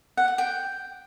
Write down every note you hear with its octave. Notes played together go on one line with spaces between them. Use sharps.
F#5
F#5
G5